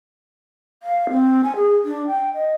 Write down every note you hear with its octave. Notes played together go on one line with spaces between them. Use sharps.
F5
C4
G#5
G#4
D4
G5
D#5